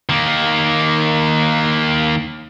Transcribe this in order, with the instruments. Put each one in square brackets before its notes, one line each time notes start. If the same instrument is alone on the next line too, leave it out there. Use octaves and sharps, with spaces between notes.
[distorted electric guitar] D#3 A#3